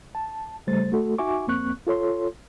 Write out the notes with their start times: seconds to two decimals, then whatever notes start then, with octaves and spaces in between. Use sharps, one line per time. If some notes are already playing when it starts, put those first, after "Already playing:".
0.15 A5
0.67 C#3 G3 A3 C5 A6
0.92 A3 F#4 A4
1.18 D#4 F#4 E5 G#5 C#6 D6
1.47 F2 A#3 C4 C#6 F#6
1.87 F4 A4 C#5 C6